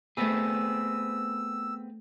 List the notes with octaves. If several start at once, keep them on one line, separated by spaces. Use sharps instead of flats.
A3 B3 C4 G#4 B5 E6